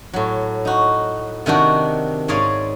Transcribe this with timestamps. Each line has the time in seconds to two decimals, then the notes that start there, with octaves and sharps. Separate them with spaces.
0.13 A2 F#3
0.65 D#4 F#4
1.46 C3 D#3 D4 F#4
2.28 G#2 G#4 C#5 D5 F5 C6